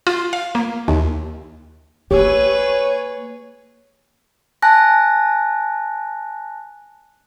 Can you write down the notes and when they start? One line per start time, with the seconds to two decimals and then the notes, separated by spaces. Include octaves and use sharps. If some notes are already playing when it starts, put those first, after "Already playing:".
0.07 F4
0.33 F5
0.55 A#3
0.88 D#2
2.11 A#3 G4 G#4 B4 C#5 E6
4.62 G#5 A5 F#6 A#6